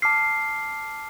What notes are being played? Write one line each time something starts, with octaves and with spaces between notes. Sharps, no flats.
A5 D6 F6 C7